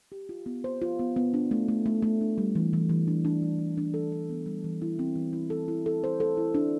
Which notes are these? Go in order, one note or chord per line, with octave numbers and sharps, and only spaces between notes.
G4
F4
B3
C5
F4
B3
B3
D4
A3
A3
A3
A3
D4
G3
E3
E3
E3
D4
D4
G3
G3
D4
A4
D4
B3
G3
E3
E4
C4
E3
E4
A4
E4
A4
C5
A4
E4
D4